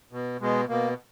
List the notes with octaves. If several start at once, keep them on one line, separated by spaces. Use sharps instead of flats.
B2
B2 G#3
B2 A#3